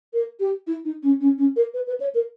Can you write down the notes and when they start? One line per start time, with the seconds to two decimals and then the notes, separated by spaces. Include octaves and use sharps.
0.13 A#4
0.40 G4
0.67 E4
0.85 D#4
1.03 C#4
1.21 C#4
1.38 C#4
1.56 A#4
1.74 B4
1.87 B4
2.00 C#5
2.15 A#4